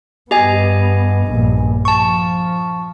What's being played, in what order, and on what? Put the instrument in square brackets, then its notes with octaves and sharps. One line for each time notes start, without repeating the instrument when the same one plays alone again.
[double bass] G2 B3 [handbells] G4 D#5 G#5
[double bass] A#1 G2
[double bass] F3 [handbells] A5 C#6